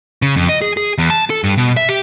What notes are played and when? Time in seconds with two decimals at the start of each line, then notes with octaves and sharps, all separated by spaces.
0.22 C#3
0.36 F2
0.49 D#5
0.61 G#4
0.77 G#4
0.98 E2
1.10 A5
1.30 A4
1.44 G2
1.58 B2
1.77 E5
1.89 G4